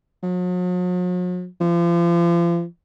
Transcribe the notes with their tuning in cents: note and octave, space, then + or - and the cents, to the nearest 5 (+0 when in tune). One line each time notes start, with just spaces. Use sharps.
F#3 -45
F3 -35